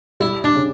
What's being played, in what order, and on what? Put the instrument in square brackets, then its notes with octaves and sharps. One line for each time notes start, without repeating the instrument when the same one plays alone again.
[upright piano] G3 [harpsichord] E4
[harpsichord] D4
[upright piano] C#3